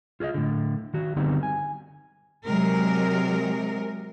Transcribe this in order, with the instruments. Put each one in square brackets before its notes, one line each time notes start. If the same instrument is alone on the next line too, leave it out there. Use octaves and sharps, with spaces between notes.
[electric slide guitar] F4 G#4 C#5 D#5
A2 D3
D#3 F#4
D3 F#3 G3 B3 C4 D#4
G#5
[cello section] C3 F#3 G#3 A#4